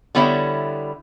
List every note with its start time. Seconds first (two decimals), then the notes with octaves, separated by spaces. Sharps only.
0.15 D3 G3 B3 E4 C#5 E5